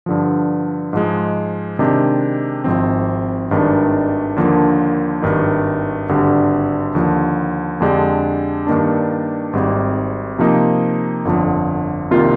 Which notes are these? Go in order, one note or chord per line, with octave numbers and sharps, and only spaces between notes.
G2 D3 F3
G#2 F3 G#3
C3 D#3 G#3 D4 G4
G#1 G#2 F3 C4
G#1 G2 D#3 G#3 D4
D#2 D3 F3 A#3 D4
G#1 G2 D#3
G#1 G2 D3 G3
D#2 D3 F3
F2 D3 G#3 D4 G4
G2 D#3 A#3 D4
G#1 G#2 G3 C4
C3 F3 A#3 D#4
G1 F2 D3 F3
C2 C3 D#3 A#3 F4